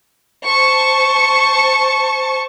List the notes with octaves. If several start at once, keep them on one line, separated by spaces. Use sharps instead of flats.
C5 A5 C#6